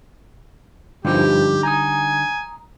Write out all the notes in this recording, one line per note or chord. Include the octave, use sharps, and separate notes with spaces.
G2 D3 F3 G3 D#4 G4
G#5 A#5 D#6